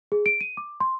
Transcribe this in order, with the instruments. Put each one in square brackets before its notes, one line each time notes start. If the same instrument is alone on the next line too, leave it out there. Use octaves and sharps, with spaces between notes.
[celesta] G#4
D7
D#7
D6
C6